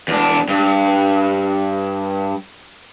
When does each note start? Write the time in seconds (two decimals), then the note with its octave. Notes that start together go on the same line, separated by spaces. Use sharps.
0.08 E2 D4
0.48 G2